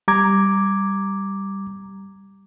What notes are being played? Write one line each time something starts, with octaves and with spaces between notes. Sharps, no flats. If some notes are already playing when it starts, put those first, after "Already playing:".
G3 A#5 D6 G#6